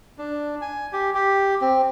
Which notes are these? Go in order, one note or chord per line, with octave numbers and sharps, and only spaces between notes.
D4
G#5
G4
G4
C4